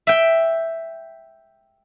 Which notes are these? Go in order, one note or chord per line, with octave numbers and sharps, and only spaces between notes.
E5 G5